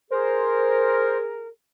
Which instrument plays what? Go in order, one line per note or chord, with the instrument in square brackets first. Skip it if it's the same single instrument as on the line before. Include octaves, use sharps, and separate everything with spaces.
[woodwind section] G#4 A#4 [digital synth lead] C5